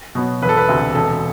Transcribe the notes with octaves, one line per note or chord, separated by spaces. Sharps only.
B2 F#3 B3
E1 B4
A4
B4
D2 C3
E1 A4